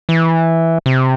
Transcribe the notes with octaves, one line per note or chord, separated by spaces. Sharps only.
E3
C3